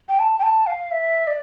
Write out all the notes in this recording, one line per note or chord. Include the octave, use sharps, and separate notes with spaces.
G5
A5
G5
A5
F5
E5
D5